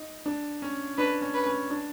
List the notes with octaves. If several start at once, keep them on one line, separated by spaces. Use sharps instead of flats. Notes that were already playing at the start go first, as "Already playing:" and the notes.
Already playing: D#4
D4
C#4
D4 B4
C#4
B4
C#4
D4